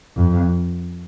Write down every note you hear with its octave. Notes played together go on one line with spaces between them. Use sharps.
F2